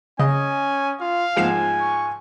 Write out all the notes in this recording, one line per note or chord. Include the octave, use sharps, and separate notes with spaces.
C#3 C#4 D#5 G#5
F4 F5
G#2 F3 G#3 F#5 G#5 C7 E7
C#6